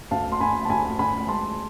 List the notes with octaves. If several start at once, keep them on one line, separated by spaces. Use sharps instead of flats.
D2 F5 A5
C6
D2 G#5 B5
A5
D2 G#5 B5
D2 G#5 B5
G#3 A5 C6